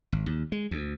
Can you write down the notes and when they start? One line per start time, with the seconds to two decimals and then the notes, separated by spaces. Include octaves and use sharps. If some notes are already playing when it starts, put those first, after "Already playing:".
0.12 G#1
0.26 D#2
0.52 G#3
0.71 D2